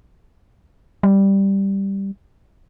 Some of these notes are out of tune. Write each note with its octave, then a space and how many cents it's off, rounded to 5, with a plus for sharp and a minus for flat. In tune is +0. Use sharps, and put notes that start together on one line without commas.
G3 +0